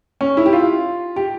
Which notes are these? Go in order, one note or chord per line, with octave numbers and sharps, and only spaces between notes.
C#4
E4
G4
F4
G4